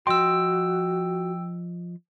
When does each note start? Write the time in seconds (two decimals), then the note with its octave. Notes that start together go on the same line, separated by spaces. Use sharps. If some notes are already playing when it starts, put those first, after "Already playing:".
0.07 F3 F#4 D#5 G5 C6 E6